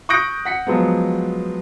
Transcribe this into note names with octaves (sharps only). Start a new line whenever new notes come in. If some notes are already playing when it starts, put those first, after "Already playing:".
C#6 D#6 F#6 G6 A#6 D7
F#5 B6 C#7
F3 F#3 G#3 B3